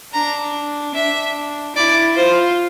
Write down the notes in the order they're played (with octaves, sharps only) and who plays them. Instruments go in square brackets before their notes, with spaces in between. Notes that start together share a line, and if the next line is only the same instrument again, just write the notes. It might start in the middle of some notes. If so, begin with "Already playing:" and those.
[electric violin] D4 [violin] A#5
[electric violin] D4 [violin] E5
[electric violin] E4 [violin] D5
[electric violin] F4 [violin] C5